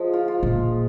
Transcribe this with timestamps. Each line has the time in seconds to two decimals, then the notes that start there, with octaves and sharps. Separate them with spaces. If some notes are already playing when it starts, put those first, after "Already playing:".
Already playing: F3 G#3
0.13 F4
0.28 F4
0.43 A#2